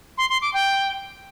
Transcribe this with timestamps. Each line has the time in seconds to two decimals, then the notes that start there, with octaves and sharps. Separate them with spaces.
0.18 C6
0.30 C6
0.42 D6
0.54 G5